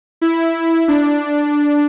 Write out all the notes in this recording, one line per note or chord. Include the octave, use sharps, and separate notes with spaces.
E4
D4